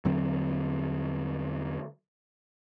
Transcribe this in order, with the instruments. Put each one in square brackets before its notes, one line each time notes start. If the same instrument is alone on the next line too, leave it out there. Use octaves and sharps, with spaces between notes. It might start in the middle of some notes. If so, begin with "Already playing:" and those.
[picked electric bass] E2 D3 F#3 C4